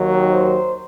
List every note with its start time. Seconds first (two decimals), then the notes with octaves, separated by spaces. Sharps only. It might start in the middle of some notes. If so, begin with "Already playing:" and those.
Already playing: D#2 D#3 F#3
0.29 C5